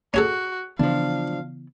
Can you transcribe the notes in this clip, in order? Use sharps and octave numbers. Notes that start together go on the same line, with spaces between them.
C#4 F#4 G#4 A4
C#3 E3 F3 B3 D4 F5